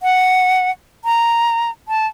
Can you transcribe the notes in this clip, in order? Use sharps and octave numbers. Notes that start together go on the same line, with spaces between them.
F#5
A#5
A5